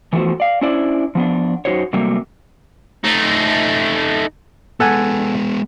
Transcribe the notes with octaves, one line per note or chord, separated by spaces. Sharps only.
E3 F3 A3 B3 F#4 C5
D5 F5
C#4 D4 E4 C5 D5
F3 B3 D4
F#2 C#3 D#4 F#4 C5 C#5
C3 F#3 G3 A3 A#3 C4
A3 D#4
G#3 B3 A4 F#5 G#5